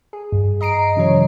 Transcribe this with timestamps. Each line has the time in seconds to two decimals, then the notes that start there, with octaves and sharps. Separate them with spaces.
0.13 G#4
0.32 G2
0.61 D#5 A#5 C7 D7
0.96 C#3 E3 F#3 C#5